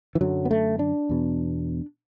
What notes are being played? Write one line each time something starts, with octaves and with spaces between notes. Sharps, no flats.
E3
F#2 D3 F#3
B3
A3
D4
E2 B2